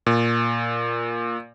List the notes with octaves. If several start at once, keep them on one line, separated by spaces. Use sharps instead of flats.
A#2